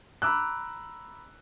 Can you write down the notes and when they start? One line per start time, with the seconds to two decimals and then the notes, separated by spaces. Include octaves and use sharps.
0.22 A#5 B5 D6 E6 F#6